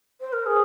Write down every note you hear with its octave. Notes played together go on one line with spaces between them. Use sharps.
C5
A#4
G#4